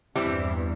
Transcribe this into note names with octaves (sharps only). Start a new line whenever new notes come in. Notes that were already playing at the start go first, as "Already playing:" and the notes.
E2 G2 E3 G3 C4 E4